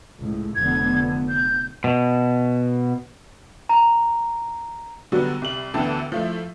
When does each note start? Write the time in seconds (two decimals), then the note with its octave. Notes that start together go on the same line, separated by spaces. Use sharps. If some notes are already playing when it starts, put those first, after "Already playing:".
0.20 C#2 A2
0.55 F1 D3 B3 G#6
1.28 G6
1.84 B2
3.69 A#5
5.12 D3 F#3 G3 B3 D4 F#4
5.42 C2 G3 F#7
5.74 D2 D3 E3 B3 G5 A5
6.12 F3 A3 E4